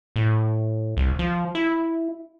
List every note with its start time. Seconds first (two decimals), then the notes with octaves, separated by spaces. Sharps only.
0.16 A2
0.97 C2
1.19 F3
1.55 E4